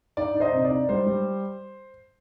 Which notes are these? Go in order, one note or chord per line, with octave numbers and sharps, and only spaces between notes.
D#4 D5
D#4
C5 D#5
C3
D5
D#4
G3 C5
G3